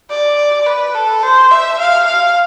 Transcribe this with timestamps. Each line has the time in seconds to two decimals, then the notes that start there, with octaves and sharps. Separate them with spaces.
0.10 D5
0.67 B4
0.95 A4
1.23 C5
1.51 E5
1.79 F5
2.06 F5